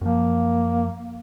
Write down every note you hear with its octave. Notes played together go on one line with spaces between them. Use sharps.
F#2 F3 A#3